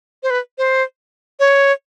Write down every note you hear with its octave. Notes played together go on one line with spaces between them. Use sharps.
C5
B4
C5
C#5